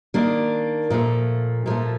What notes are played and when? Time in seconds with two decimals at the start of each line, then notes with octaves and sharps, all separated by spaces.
0.14 D#3 A#3 D4
0.90 A#2 F3 A3
1.66 A#2 F3 A3